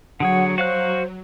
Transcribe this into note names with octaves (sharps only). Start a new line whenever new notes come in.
D3 F#3 G#4 C#5 F#5
F#4 C5 F5 F#6